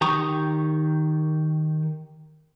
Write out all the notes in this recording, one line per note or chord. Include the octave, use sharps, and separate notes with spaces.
D#3 G4 A#5 C#6 D#6